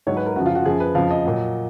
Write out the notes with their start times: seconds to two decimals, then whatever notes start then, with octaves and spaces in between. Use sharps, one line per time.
0.07 G#2 F#3 C#5
0.17 B4
0.26 A#4
0.36 F#2 C#3 F3 F#4
0.46 F4
0.55 F#4
0.65 F#2 F3 G#4
0.80 B4
0.95 F2 C#3 F3 F5
1.11 D#5
1.25 A#2 F#3